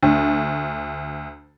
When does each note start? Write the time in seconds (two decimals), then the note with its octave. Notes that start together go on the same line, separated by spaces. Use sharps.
0.03 D2